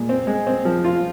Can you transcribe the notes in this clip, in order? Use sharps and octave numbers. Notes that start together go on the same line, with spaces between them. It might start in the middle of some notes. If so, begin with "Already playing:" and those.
Already playing: A#2 G#3
C4
G#3
C4
F3
F4